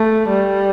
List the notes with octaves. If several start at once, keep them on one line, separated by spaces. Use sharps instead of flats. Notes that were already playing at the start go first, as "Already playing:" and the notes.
Already playing: A3
G3